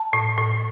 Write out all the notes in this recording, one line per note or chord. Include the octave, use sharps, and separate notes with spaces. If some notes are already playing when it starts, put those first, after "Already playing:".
Already playing: A5
A2
A2